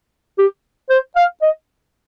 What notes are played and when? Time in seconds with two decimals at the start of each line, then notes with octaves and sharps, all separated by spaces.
0.38 G4
0.90 C5
1.16 F5
1.42 D#5